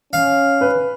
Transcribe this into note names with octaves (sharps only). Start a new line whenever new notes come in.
C#4 F5
B4